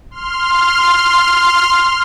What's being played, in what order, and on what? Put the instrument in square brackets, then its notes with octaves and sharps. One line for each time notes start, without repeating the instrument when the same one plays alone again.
[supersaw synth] C6 F6